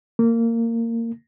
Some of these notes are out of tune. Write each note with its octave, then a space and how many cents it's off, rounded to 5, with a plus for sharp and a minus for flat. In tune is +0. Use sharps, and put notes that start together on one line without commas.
A#3 -20